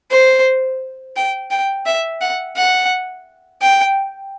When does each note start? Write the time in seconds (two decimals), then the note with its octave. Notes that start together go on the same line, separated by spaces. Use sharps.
0.11 C5
1.16 G5
1.51 G5
1.86 E5
2.21 F#5
2.56 F#5
3.62 G5